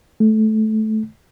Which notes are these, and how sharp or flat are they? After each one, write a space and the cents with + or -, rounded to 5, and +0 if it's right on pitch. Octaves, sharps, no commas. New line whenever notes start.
A3 -15